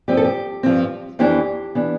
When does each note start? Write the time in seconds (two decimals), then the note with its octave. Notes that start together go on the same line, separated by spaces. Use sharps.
0.08 G2 F3 C4 G4
0.17 A4
0.24 G4
0.63 G2 F3 C4
1.19 F2 E3 B3 D4 G4
1.75 E3 B3 D4